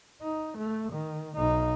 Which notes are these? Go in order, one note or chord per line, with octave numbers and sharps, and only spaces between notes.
D#4
A3
D#3
B1 D#4